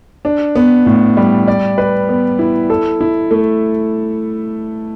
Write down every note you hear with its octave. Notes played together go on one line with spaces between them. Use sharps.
D4
B3
A2
G3
D5
B4
B3
E4
A4
E4
A3